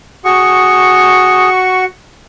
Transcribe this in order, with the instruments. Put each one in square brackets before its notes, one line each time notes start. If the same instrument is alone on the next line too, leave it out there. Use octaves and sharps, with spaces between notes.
[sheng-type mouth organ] F#4 C#6 [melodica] G#4